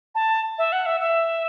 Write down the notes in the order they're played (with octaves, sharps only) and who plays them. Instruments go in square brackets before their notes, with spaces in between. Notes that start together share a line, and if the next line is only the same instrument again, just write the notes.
[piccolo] A5
E5
F#5
E5
E5